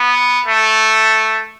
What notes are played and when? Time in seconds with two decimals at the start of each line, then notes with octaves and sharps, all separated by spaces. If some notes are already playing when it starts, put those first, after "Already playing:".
Already playing: B3
0.46 A3